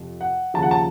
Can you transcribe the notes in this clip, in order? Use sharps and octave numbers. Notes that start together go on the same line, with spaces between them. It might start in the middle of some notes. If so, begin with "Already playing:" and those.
Already playing: F2 C3 F3
F#5
D#2 C#3 F3 A5
F#5
A5